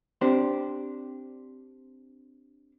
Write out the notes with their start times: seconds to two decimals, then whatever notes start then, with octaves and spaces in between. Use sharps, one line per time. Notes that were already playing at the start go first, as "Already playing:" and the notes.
0.21 C4 D4 G4 C5